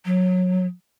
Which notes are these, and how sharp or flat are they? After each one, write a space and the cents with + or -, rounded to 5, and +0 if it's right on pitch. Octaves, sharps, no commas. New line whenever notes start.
F#3 -15